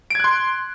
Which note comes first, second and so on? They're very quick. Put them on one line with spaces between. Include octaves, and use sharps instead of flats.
D7 G#6 F#6 C6